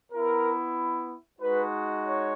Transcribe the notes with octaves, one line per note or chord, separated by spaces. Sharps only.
B3 E4 A#4
G#3 D#4 F#4 B4
C#5